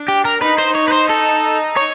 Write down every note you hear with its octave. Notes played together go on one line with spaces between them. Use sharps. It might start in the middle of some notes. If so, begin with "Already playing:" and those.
Already playing: D4
G4
A#4
D#4 B4
C5
C#5
B4
C5
A4
C#5